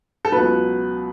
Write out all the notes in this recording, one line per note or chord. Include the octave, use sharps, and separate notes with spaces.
A4
C#2 B2 F#3 B4